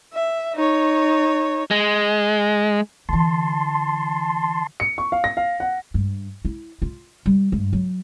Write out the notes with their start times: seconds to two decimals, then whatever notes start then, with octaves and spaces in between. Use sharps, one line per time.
0.14 E5
0.55 D#4 C#5
1.71 G#3
3.09 D3 E3 A5 C6
4.80 C#7
4.98 C#6
5.12 F5
5.24 A#6
5.37 F5
5.60 F#5
5.94 G2
6.45 E4
6.82 F4
7.26 G3
7.52 G2
7.73 F#3